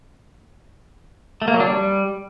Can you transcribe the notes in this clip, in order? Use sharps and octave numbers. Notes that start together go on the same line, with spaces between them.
A3
A#3
F#3
D4
G3